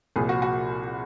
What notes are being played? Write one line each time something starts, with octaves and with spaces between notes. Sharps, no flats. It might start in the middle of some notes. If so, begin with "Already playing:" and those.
C2 A#2 F3 G#4
F#4
F#4